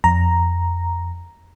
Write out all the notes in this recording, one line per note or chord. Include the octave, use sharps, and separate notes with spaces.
F2 A#5